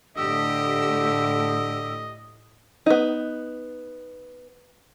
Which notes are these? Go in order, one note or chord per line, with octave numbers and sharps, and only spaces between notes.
A2 D3 G4 D#5 E6
B3 D#4